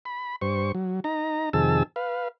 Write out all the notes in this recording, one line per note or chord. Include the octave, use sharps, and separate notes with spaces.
B5
G2 C5 C#6
F#3
D#4 A#5
F2 C3 D#3 G#4 A5 E6
B4 F5